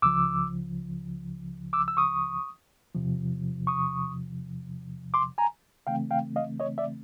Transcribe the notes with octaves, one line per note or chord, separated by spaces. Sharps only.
C#2 C#3 F3 D6 E6
D6 E6
E6
C#6 D#6
E2 C3 F3
C#6 D#6
C6 D6
G#5 A#5
C#3 E3 A3 C4 F5 G5
F5 G5
D#5 F5
C#5 D#5
D5 E5